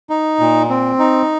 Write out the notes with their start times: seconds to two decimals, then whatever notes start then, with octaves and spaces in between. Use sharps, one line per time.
0.10 D#4
0.40 A#2
0.69 C4
0.99 D#4